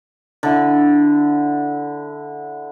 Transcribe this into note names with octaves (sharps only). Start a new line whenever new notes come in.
D3 E4